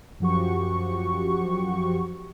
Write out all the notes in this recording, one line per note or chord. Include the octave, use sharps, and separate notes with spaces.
F#2 F3 F#4 G4 C#6